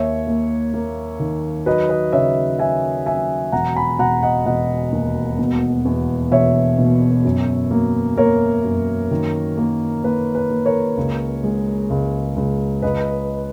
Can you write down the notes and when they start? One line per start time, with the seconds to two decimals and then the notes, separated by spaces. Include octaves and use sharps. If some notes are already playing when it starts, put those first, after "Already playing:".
Already playing: D#2 C#5 E5
0.27 A#3
0.74 A#3
1.20 D#3
1.66 F#3 B4 D#5
1.89 B4 D#5
2.13 C#3 C#5 E5
2.59 F#3 E5 G#5
3.06 F#3 E5 G#5
3.52 E1 F#5 A#5
3.75 G#5 B5
3.99 E1 F#5 A#5
4.23 D#5 F#5
4.46 E1 D#5 F#5
4.92 D#2
5.39 B2
5.85 E2
6.31 E1 C#5 E5
6.79 B2
7.24 F#2
7.71 A#3
8.17 A#3 A#4 C#5
8.64 F#2
9.11 D#3
9.57 A#3
10.03 A#3 B4
10.35 B4
10.50 A#3
10.66 A#4 C#5
10.97 C#2
11.43 G#3
11.90 C#2
12.36 C#2
12.82 C#2 B4 D#5